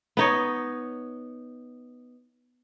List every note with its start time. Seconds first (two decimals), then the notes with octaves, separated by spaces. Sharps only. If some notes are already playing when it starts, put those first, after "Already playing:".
0.17 B3 D#4 C#5